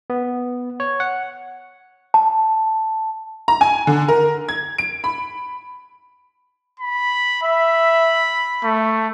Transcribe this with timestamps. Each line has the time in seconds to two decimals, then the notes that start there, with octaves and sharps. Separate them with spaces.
0.10 B3
0.80 C#5
1.00 F#5
2.14 A5
3.48 A#5
3.61 G#5
3.87 D3
4.08 A#4
4.49 G#6
4.78 D7
5.04 B5
6.79 B5
7.43 E5 B5
8.64 A3